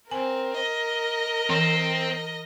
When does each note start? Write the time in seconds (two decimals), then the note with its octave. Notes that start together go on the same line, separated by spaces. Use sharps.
0.11 C4 A#4 G#5
0.58 D#5
1.50 E3 C4